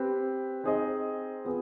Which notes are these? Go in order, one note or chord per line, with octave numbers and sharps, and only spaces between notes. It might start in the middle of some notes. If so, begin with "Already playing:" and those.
Already playing: C4 G4 B4
C4 D#4 G#4 C5 D#5
B3 F4 G#4